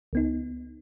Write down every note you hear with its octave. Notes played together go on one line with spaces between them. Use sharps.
C#2 B3 D#4